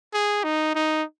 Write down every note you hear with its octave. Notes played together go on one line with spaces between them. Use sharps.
G#4
D#4
D#4